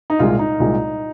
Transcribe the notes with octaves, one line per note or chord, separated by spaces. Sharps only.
D#4
C2 A#2 G#3 F4
D#4
C2 A#2 G#3